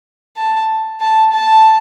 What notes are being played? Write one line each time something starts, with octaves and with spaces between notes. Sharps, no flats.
A5
A5
A5